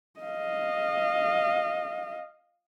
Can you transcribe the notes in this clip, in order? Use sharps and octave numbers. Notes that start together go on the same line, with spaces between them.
D#5 F5